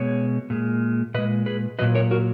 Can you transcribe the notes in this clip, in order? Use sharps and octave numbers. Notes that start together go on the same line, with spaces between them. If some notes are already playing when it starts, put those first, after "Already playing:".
Already playing: B2 G#3 C#5
A#2 G#3
A#2 G#3 B4 D#5
G#4 B4
A#2 F#3 B4 D#5
A#4 C#5
F#4 A#4